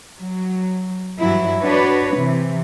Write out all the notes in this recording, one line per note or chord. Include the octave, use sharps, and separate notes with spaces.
F#3
G2 E3 F#3 E4
D4 F#4 B4 C#5
C3 E3